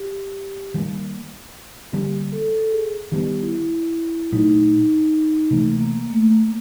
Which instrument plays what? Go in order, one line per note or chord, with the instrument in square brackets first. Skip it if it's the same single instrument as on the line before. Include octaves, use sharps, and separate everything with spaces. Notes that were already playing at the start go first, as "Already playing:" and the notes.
Already playing: [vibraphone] G4
[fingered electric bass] D#3 G3 A#3
[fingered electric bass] D3 G3 A#3 D4 [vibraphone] G4
[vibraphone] A4
A4
G#4
[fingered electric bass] D#3 G3 B3 [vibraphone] G4
[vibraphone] E4
[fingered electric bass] A#2 F#3 A3 [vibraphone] D#4
[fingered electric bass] C3 E3 A3 [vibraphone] A#3
[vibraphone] A#3
A3
A#3